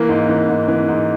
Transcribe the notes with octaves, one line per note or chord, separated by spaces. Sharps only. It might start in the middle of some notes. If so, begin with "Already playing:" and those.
Already playing: E3 A#3
G#2
E3
G#2
E3
G#2